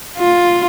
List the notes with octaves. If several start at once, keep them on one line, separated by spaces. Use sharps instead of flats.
F4